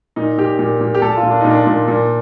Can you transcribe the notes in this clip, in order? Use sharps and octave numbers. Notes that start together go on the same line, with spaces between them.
A#2 D#4
A#2 G4
A#2
A#2
G4
A#2 A4
F4
A#2
D4
A#2 D#4
D4
A#2
A#2